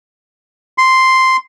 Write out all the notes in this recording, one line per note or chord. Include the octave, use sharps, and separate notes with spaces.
C6